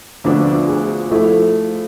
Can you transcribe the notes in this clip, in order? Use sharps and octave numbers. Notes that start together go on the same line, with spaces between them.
D2 D3 F3 B3 D4 F4
G#4
F3 A3 E4 A4